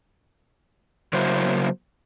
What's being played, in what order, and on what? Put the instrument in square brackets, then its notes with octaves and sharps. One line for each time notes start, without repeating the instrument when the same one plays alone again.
[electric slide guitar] C#3 F#3 A#3 E4 F#4 C5